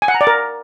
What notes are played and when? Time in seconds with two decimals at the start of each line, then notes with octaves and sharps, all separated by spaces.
0.02 G#5
0.08 F#5
0.14 A#5
0.21 D5
0.27 A#4